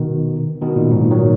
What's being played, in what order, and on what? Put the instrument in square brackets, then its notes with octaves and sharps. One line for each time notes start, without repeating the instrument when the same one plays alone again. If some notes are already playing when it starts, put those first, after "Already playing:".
Already playing: [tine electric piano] B2 D#3
B2 D#3
A#2
G#2
A#2
D#3 F#3